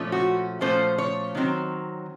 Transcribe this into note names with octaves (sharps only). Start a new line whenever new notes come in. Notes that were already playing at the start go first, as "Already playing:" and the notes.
Already playing: A#2 F3 A3 C#4
F#4
A#2 F3 A3 C#4 C5
C#5
D#3 F#3 C4